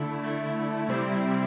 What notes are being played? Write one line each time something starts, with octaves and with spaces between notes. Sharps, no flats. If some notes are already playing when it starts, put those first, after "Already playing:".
Already playing: D3 A3 E4
D3 A3 E4
C3 G3 C4 E4